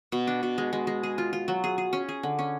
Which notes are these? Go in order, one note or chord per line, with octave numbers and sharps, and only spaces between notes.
B2
D4
B2
G#3
G#3
G#3
G#4
F4
F4
F#3
G#4
G#4
C#4
G#4
D3
C#4